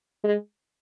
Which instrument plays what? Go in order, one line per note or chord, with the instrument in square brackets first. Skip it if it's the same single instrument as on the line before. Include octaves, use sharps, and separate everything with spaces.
[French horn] G#3